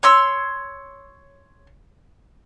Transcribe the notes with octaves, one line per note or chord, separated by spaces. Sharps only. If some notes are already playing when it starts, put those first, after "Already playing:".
C#5 C6 E6